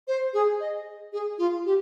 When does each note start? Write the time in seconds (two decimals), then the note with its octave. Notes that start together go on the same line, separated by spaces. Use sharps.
0.08 C5
0.34 G#4
0.60 D#5
1.13 G#4
1.38 F4
1.65 G4